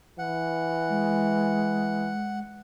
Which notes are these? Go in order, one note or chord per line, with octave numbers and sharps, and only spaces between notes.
E3 F#5
G#3